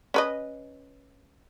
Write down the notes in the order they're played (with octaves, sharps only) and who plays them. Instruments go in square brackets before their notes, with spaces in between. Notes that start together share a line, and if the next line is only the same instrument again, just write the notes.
[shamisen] C#4 B4 D#5